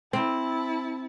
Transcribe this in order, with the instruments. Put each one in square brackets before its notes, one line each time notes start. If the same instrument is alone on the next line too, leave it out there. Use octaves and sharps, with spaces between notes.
[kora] C4 [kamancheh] E4 A5